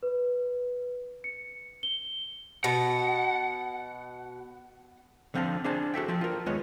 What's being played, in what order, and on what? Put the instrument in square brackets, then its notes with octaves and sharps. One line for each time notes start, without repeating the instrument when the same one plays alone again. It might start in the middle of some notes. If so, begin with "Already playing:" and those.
[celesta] B4
C#7
G7
[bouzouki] B2 [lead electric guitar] F#5
[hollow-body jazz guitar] D3 F3 C4 F5 G5 A5
D4 G#4 C5 A5
F#4 A4 E5 G5
F3 G5 A5
F4 A#4
D#2 G#3 B3 C#5